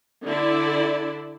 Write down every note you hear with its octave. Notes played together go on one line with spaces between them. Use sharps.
D3 E4 D5